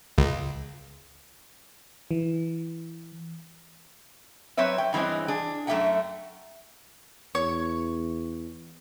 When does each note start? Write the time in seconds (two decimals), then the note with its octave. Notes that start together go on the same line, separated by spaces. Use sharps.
0.18 C#2
2.11 E3
4.57 F#3 C4 B4 C#5 E5
4.78 G5
4.93 G2 E3 G#3 C4 C#4
5.28 D4 G#4
5.67 F#2 A3 A#3 E5 F#5 G5
7.35 E2 C#5 C#6